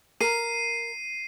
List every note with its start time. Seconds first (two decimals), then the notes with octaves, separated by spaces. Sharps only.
0.21 A#4 C7 D#7